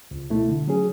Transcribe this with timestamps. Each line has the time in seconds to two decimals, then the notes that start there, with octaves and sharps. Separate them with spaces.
0.11 C#2
0.30 B2 A3 E4
0.49 D3
0.68 F#3 C#4 G#4